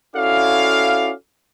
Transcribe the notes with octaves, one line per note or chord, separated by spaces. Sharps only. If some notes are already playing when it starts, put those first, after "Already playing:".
C#4 E4 F#4 A4 D5 F5